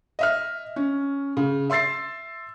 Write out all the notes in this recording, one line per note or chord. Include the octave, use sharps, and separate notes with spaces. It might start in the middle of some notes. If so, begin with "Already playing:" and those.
D#5 E5 F6
C#4
C#3
E5 C6 E6 A6 C7